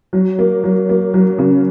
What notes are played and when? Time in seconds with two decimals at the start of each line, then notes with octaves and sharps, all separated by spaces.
0.13 F#3
0.39 A#3
0.64 F#3
0.89 A#3
1.14 F#3
1.38 C#3